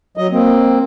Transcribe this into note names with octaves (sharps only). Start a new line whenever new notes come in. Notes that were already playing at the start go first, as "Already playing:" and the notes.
F#3 D#5
A#3 C4